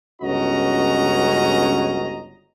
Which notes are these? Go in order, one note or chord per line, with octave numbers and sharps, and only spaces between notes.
G1 C#2 C#4 F#4 D#5 A#5